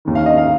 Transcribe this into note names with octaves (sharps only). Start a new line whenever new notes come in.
D#2 D#3
F5
D#5
F5